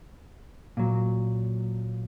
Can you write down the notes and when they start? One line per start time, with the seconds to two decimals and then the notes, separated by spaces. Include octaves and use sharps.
0.77 A#2 F#3